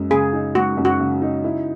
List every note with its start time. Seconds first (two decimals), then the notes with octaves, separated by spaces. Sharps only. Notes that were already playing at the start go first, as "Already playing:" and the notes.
Already playing: F#2 G#3
0.10 C#3 G#4
0.33 D#4
0.55 G#3 F#4
0.77 F#2
0.85 F#4
1.00 C#3
1.22 D#4
1.44 E4